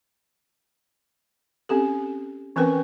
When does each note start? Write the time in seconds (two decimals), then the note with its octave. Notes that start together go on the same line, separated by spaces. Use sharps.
1.69 C4 C#4 G4 A4
2.56 E3 C4 C#4 A#4 B4 G5